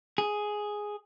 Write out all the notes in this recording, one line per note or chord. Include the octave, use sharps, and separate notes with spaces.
G#4